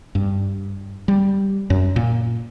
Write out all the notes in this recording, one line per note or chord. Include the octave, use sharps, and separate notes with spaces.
G2
G3
F#2
A#2